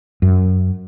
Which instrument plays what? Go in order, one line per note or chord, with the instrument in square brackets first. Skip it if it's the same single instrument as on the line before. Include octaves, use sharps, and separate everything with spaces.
[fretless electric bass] F#2